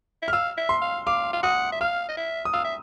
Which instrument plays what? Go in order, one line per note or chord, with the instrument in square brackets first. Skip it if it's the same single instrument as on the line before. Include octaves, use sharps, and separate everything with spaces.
[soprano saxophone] E5
[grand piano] F6
[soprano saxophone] F5 [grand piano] E6
[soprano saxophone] E5
[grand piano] C6
[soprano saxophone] F5
[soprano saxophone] F5 [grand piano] D6
[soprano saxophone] F5
[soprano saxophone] F#5 [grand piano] D#6
[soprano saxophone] E5
[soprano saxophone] F5 [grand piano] F6
[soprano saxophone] D#5
E5
[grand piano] D#6
[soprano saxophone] F5 [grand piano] E6
[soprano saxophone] E5